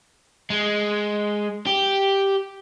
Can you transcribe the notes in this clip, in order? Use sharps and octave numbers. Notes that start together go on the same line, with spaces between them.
G#3
G4